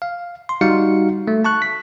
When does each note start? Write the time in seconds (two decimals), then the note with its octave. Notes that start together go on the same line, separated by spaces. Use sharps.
0.02 F5
0.49 C6
0.61 G3 D#4 F#4 F5 C#7
1.27 A3
1.44 A5 C#6 F#6
1.62 B6